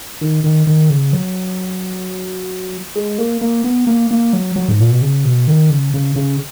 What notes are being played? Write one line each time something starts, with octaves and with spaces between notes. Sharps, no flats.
D#3
D#3
D#3
C#3
F#3
G#3
A#3
A#3
B3
A#3
A#3
F#3
F#3
G#2
A#2
B2
C#3
B2
D#3
C#3
C#3
C#3